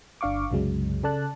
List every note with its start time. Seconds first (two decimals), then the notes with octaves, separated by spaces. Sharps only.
0.21 G1 D4 F5 C#6 D6
0.51 C2 F#2 C#3 F#3 G#3
1.03 C#3 A4 D5 A5 F#6